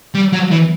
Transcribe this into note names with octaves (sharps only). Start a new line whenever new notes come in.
G3
F#3
E3